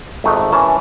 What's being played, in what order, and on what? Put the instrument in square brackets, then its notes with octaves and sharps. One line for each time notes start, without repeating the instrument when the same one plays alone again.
[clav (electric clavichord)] G#1 F2 A3 D#4 F#5
E3 C#4 A#4 A5